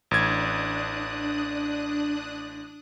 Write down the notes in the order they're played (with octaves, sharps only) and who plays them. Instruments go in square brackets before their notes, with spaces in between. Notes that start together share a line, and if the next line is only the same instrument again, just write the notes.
[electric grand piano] A1 G#6 [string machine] D4 D#6 F#6